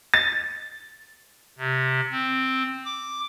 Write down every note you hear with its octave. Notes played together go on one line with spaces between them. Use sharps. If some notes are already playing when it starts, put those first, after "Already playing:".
A6
C3
C4
D6